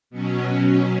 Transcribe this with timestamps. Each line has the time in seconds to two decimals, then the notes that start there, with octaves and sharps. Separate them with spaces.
0.10 B2 F#3 C#4